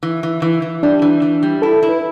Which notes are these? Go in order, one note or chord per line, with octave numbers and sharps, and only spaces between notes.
E3
E3
E3
E3
G3 D4
E3
E3
G3
E4 A4
E4
B4